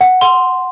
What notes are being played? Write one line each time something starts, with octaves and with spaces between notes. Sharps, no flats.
F#5
F#5 C6